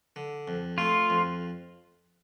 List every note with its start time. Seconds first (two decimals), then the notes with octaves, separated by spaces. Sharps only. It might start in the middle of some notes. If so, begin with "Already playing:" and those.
0.16 D3
0.48 F2
0.78 A3 F4
1.10 F2